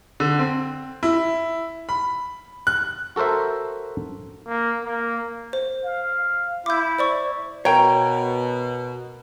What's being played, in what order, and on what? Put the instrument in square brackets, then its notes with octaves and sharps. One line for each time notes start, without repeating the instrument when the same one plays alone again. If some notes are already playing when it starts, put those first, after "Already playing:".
[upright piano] D3
C4
E4
B5
F#6
[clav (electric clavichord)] F#4 A4 A#4 C5 E5
[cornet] A#3
A#3
[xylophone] C5
[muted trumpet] F5
[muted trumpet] E4 [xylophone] D6 G6
[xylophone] C5 D5 C#6
[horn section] B2 [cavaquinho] A#4 [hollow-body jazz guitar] C#5 G5